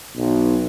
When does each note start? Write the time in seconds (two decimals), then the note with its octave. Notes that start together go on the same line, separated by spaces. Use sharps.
0.16 B1